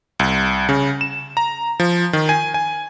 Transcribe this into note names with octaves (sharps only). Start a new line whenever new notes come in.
C2
C#3
E7
A#5
F3
D#3
G#5
G#5